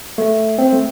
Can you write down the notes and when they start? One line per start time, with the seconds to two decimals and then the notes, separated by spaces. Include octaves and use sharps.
0.18 A3
0.58 C4
0.73 A3